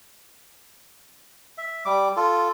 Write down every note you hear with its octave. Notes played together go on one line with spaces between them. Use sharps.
E5
G3 D6
F4 A4